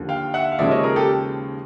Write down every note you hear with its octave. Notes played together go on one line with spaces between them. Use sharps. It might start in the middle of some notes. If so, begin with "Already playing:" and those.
Already playing: D#2 D3 F3
F5 G5
E5 F#5
F5
D#2 C#3 F3 G#3 D5 E5
C#5 D#5
G#4 A#4
G4 A4